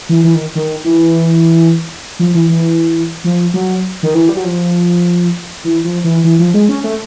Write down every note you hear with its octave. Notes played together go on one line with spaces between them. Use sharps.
E3
E3
D#3
D#3
E3
F3
E3
E3
F3
F#3
D#3
E3
G3
F#3
F3
E3
F3
E3
E3
F3
G#3
C#4
A3